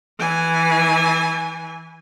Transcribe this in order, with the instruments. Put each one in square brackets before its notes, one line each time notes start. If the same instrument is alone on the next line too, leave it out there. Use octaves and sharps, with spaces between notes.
[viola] E3 G#5